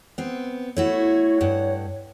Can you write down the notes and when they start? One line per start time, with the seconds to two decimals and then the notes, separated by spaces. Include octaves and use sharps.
0.18 B3 C4
0.77 A3 E4 F#4 C#5
1.41 G2 F#5